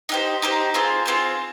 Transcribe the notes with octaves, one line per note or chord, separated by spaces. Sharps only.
D#4 G4 C5
D#4 G4 C5
C4 F4 G#4 C5
C4 F4 G#4 C5